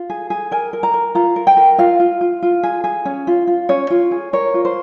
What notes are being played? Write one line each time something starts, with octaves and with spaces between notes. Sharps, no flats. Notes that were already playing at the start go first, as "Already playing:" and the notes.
Already playing: F4
G#4
G#4
A#4 G#5
A#4
A#5
A#4
F4 A#5
A#4
G5
A#4
F4 F5
F4
F4
F4
G#4
G#4
C#4
F4
F4
C#4 C#5
F4
G#4
A#4 C#5
F4
C5